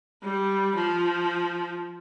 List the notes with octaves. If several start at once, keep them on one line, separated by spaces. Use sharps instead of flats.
G3
F3